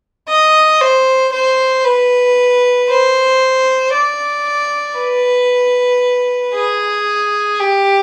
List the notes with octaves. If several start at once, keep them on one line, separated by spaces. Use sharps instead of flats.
D#5
C5
C5
B4
C5
D5
B4
G#4
G4